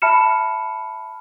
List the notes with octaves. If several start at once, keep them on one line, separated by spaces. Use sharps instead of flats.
E5 A5 B5 F6 C#7 E7